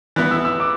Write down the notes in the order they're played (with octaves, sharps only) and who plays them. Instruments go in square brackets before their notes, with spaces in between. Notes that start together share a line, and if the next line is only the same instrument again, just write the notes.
[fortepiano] E3 B3 E4 [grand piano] F#6
[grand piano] E6
E6
D6